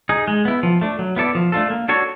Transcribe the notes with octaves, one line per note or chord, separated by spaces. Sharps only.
D#4 G#4
G#3
B3 E4
F3
A3 D4
F#3
B3 E4 A4 D5
F3
A3 D4 F4 A4
A#3
D4 F#4 A4 C#5